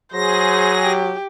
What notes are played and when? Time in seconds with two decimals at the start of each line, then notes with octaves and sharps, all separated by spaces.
0.14 F#3 G#4 C5 A#6
0.81 G4